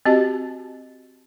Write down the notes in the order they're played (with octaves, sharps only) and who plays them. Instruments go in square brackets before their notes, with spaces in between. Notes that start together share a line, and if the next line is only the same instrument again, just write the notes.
[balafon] C4 F#4 G4 D#5 A5